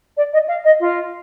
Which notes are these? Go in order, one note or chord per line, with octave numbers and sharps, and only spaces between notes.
D5
D#5
F5
D#5
F4